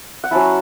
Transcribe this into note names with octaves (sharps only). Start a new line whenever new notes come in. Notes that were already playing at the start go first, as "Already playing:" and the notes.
F#5
F#3 C#4 E4 A5